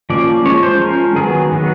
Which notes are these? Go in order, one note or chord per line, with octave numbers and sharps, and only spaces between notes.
F3 A#3 C#4 D5
F3 G#3 C#4 C#5
C5
F3 G#3 C#4 A#4
D#3 F#3 B3 G#4
D#3 F#3 B3